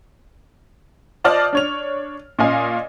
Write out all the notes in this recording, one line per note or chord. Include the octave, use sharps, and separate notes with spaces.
F4 C5 D5 D#5 A5 F6
D4 C#5 F7
A#2 C#4 D#5 F5 G#5